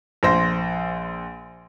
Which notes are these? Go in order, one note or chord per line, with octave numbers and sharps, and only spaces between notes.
A#1 C5 A#6